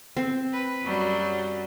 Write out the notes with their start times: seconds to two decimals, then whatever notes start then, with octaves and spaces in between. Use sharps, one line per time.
0.17 C4
0.53 B4
0.82 F#2 F#3 G3